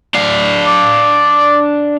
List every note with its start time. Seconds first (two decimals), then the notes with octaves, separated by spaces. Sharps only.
0.14 D4 F5
0.67 D5